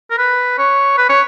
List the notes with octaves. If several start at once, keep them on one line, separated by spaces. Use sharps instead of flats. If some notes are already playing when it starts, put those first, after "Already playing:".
A#4
B4
C#5
B4
C#5